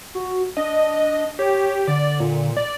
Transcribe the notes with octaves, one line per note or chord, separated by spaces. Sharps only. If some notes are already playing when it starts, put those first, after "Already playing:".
F#4
D4 D#5
G4 C#5
D3 D5
A#2
D5